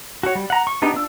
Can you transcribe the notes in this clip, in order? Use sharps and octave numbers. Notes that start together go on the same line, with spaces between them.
F#4 C#5
G3
F#5 A#5
C#6
B3 D4 D#4 G4
D4 F4 E6